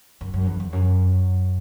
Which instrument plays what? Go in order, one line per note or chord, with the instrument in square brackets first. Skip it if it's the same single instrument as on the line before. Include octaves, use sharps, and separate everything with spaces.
[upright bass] F#2
F#2
E2
E2
F#2